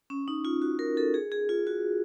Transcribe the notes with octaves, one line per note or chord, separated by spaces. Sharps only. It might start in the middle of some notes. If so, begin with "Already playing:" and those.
C#4
D#4
F4
F#4
A#4
A4
G#4
G#4
F4
F#4